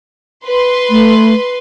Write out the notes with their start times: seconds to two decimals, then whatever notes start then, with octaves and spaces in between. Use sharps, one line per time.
0.44 B4 C6
0.90 A3